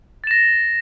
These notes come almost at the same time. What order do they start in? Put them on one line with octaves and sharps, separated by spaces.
A6 E7 A#6